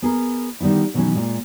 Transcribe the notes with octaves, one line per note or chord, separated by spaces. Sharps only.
B3 G#4 A#4
D3 D#3 G3 B3 E4
B2 D#3 E3 F#3 A3 C#4
A#2 G#3